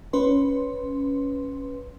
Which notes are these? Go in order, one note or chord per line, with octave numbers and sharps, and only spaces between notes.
C#4 B4 C6